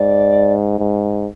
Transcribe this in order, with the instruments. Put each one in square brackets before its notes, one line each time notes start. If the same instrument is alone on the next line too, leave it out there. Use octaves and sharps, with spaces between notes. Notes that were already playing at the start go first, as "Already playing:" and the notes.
Already playing: [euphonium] G#2 [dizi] D5
[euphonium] G#2